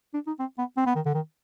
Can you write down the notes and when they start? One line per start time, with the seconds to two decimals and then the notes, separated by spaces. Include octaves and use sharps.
0.14 D4
0.27 D#4
0.39 C4
0.58 B3
0.77 C4
0.86 B3
0.95 D#3
1.06 D3
1.14 D#3